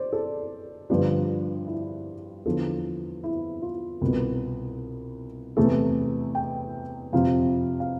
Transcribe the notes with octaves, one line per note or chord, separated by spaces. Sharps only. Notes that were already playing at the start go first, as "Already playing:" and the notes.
Already playing: C5 D5
A4
G2 D3 F3 B3 D4 G4
E4
E2 D3 F3 A4
E4
F4
C2 B2 B3
E2 C3 E3 A3 A4
G5
F2 C3 F3 F5
F5